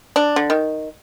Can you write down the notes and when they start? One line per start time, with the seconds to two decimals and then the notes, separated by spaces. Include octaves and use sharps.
0.16 D4
0.36 D3
0.50 D#3